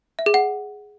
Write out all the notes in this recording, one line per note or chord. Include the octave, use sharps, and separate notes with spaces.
E5
G#4
F#5